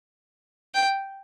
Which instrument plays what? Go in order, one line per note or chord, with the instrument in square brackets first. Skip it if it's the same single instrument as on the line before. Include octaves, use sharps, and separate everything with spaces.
[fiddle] G5